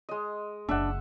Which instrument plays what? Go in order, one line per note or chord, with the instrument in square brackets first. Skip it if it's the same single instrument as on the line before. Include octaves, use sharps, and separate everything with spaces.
[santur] G#3 D#5
[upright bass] F#1 E3 [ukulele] D4 [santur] E5 F#5